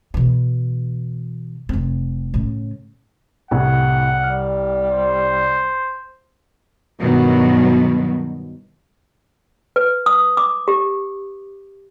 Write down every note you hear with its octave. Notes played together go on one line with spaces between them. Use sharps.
B2 E3
F1 C4
A2 C#3
C2 A2 C3 F#5
G3 F6
C5
G2 B2 D#3 F#3
B4
D#6
D6
G4